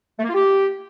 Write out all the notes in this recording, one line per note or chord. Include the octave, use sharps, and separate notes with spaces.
A3
A#3
F4
G4